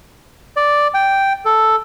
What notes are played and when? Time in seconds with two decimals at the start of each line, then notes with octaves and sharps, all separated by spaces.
0.56 D5
0.94 G5
1.45 A4